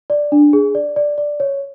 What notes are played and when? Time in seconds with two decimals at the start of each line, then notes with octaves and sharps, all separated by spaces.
0.10 D5
0.32 D4
0.53 G#4
0.75 D5
0.96 D5
1.18 D5
1.40 C#5